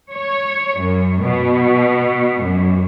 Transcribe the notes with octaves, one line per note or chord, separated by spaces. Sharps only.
C#5
F#2
B2
F#2